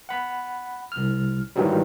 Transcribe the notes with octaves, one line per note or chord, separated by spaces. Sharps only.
F#5 B5
C2 F6
G#2 D#3 E3 F#3 G3